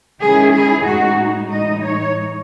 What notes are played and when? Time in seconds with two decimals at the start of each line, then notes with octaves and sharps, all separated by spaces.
0.21 D#3 G#3 C#4 E4 G#4
0.54 G#4
0.85 A2 G#3 D#4 F#4
1.50 A2 E3 G#3 D#4 D#5
1.83 C#5